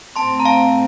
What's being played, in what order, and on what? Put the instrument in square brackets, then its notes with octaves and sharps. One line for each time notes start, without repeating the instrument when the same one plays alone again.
[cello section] A2 A3 C4 [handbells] A5 C6
[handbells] A#5
F5 A5